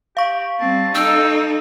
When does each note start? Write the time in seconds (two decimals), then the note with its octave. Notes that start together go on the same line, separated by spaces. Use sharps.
0.17 G4 F5 C#6
0.60 G3 C4 A5
0.95 D#4 A4 G5 E6